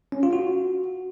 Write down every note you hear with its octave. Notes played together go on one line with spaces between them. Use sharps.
C#4
F4
F#4